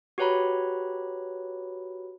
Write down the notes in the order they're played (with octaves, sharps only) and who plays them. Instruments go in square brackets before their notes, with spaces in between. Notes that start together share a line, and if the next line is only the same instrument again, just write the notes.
[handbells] F#4 G4 B4 C#5 A#5 B5